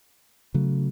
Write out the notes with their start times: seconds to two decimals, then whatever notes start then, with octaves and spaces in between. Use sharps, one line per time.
0.54 C#3 F#3 A3